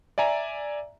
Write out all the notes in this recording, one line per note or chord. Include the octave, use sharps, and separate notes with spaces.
D5 E5 G#5 A#5